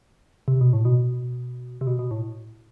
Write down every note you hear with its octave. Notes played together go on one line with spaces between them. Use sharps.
C3
B2
A2
B2
C3
B2
B2
A2